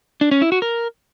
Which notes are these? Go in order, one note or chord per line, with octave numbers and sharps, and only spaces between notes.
D4
C#4
E4
F#4
A#4